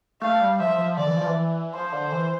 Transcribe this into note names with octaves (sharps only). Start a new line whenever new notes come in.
A3 F5
G3
F3 E5
F3
D3 D5
E3
F3
E3
F3 C5
D3
E3